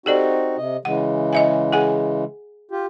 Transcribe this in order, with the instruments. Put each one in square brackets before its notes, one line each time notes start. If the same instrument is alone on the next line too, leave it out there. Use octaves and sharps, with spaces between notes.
[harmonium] C4 D#4 F#4 [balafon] G4 A4 D5
[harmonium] C3 D#5
[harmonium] C#3 E3 G#3 [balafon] F#5
[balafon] D#5 E5 G#5
G#4 F#5 G#5
[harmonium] F4 G4